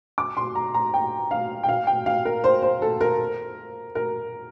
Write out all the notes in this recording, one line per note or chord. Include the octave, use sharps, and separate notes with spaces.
D6
C6
A#5
A#5
G5
F5
G5
F5
G5
F5
A#4
C5
C5
A4
A#4
A#4